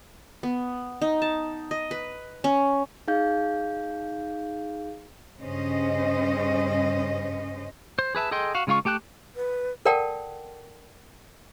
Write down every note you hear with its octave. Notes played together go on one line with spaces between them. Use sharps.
B3
D#4
A5
D#5
B4
C#4
D#4 G#4 F5 G6
G2 C#3 C#4 C5 D#5
C5
G#4 B4 E5 A5
G#4 A4 D#5 G5 C6
F#4 F5
C#3 G#3 F4 F5 C#6
A3 G4 G5 A5 F#6
B4
A4 A#4 D5 F#5 G5 A5